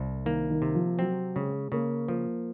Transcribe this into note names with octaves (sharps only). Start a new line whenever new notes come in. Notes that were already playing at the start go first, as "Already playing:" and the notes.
Already playing: C2
D#3 A#3
D#3
C3
F3
F#3 C4
C#3 G#3
C#3 A#3
F3 A#3